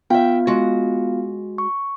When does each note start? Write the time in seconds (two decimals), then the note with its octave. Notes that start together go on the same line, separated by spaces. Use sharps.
0.10 B3 F4 E5 F5 G5
0.47 G#3 F#4
1.58 C#6